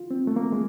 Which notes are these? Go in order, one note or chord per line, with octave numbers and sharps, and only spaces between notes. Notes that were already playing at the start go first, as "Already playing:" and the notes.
Already playing: F4
C4
A3
A#3
G#3